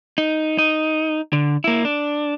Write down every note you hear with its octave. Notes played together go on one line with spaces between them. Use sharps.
D#4
D#4
D3
A#3 E4
D4